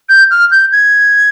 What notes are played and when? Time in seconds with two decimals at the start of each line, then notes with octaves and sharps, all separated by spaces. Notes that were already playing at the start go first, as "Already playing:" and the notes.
0.09 G6
0.31 F6
0.51 G6
0.72 G#6